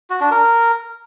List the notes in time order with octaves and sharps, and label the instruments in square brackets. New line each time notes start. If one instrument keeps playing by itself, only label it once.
[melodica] F#4
D4
A#4